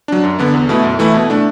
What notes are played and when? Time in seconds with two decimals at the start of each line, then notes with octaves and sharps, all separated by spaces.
0.08 F#3 D4
0.23 F#2
0.39 D3 B3 D4
0.54 E2
0.69 B2 A3 E4
0.84 F#2
0.99 E3 A3 E4
1.14 B2
1.30 A3 D4